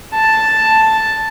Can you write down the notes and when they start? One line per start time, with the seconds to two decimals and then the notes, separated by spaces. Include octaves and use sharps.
0.14 A5